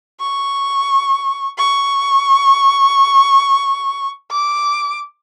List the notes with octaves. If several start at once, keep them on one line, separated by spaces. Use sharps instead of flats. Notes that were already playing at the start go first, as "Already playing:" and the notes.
C#6
C#6
D6